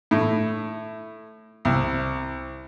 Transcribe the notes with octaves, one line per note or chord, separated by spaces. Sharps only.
A2
C2